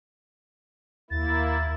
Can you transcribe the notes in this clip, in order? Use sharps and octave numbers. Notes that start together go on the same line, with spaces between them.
D#2 A#3 E4 A6